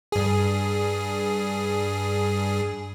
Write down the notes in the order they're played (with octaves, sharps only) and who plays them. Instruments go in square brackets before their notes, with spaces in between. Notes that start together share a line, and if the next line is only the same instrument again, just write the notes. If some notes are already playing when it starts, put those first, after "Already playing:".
[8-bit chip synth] G2 G#4